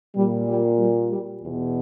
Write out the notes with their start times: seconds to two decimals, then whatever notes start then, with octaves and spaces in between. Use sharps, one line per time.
0.16 A#2 G3
0.48 G3
0.78 G3
1.11 G3
1.42 E2 B2